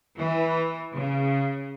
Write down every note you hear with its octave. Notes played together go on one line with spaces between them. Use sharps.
E3
C#3